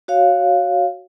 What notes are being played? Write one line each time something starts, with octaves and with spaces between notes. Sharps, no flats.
F#4 C#5 F5